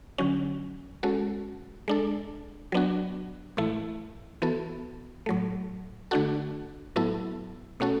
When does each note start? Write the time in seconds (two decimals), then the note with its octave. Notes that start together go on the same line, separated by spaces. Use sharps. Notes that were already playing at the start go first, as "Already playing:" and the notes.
0.18 D3 F#3 C#4
1.03 G#3 C#4 F#4 A4
1.88 G#3 D4 A4
2.72 F#3 B3 D4 F#4
3.57 A2 E3 A3 E4
4.42 E3 B3 F#4 A4
5.26 A2 F#3 A3
6.11 D3 A3 D4 F#4 A4
6.96 A2 F#3 B3 E4 A4
7.80 B2 A3 C#4 F#4 A4